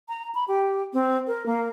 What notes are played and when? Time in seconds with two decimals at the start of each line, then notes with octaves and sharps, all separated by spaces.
0.09 A#5
0.35 B5
0.48 G4
0.93 C4
1.27 A#4
1.46 A#3